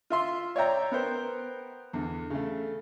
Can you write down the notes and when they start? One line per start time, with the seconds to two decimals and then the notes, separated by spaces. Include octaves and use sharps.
0.10 F4 E5 C6
0.56 C#5 D5 E5 G5 A#5
0.92 B3 A#4 C5 G5
1.93 E2 D3
2.30 C#3 A3